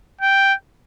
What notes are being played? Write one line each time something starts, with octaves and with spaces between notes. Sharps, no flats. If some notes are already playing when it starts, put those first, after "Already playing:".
G5